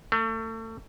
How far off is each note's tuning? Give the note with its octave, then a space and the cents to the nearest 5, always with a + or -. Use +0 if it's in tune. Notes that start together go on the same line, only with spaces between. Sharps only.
A3 +30